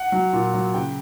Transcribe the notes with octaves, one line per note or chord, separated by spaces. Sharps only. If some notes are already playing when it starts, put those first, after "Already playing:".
Already playing: F#5
F#3
A#2
F#3
C#3 G5